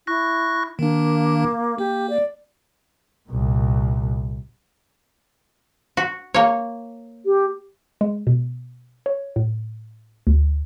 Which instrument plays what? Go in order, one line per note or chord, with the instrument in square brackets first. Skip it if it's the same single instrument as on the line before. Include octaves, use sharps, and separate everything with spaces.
[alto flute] E4 [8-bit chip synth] C#6 F#6 A#6
[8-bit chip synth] D#3 D4 [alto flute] A#3
[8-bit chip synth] A#3 [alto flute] G4
[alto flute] D5
[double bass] C2 A#2
[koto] F#4
A#3 C#5
[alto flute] G4
[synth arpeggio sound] G#3
B2
C#5
A2
D2